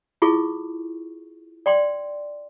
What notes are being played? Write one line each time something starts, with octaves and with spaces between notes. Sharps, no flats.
E4 F4 G#4 A4 C#6
D5 G5 C6